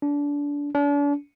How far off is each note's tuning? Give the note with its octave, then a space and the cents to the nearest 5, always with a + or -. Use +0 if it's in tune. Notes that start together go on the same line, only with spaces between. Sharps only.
D4 -25
D4 -40